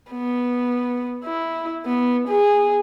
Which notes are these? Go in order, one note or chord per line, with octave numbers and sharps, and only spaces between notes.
B3
E4
B3
G#4